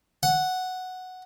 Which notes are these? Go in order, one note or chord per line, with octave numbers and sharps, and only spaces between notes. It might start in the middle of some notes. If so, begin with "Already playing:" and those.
F#5